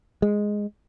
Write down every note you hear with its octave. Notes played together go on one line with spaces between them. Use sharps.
G#3